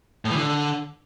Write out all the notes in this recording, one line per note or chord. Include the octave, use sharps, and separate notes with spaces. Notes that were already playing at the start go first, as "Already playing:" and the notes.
A2
E3
D3